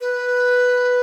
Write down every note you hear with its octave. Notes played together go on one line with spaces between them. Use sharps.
B4